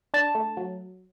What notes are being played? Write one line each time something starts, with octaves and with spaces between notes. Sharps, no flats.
D4 A5
A3
F#3